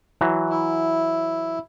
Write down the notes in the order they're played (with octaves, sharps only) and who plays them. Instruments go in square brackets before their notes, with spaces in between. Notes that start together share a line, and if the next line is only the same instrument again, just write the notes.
[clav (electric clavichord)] E3 F#3
[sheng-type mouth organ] E4